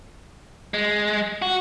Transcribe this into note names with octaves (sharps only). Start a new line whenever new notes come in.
G#3
F#4